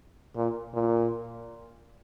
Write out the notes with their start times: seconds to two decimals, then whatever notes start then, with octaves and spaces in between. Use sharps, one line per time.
0.36 A#2
0.74 A#2